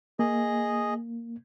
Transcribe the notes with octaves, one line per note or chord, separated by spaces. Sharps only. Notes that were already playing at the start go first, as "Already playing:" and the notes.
A#3 G#4 D#5